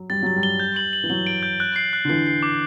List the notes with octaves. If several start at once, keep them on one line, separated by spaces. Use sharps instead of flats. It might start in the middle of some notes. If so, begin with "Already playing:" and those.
Already playing: F#3
G3 A6
F#3 A6
G3
G7
G6
F#7
F#7
E3
F#3 F#7
D7
G6
F#6
C7
F#6
D3
E3 C7
C7
D6